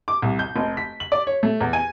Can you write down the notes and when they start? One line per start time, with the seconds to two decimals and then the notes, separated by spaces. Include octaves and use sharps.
0.08 D6
0.22 C2
0.39 G6
0.56 F1
0.77 B6
1.00 F#7
1.12 D5
1.27 C#5
1.43 A3
1.61 E2
1.73 G#5